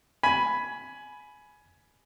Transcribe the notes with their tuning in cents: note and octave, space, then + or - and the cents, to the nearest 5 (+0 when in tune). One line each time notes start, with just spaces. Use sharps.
G#5 +15 B5 +0